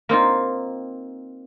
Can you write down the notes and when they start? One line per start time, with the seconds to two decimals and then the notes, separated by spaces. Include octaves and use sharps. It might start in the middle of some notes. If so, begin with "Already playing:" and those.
0.09 A#3 C4 D#4 F4